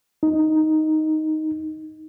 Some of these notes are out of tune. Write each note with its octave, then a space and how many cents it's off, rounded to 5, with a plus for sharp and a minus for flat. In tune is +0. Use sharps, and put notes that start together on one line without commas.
D#4 +5